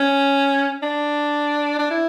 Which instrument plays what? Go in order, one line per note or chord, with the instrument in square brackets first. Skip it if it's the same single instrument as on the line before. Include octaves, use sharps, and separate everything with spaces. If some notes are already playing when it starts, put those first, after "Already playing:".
Already playing: [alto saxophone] C#4
D4
D4
E4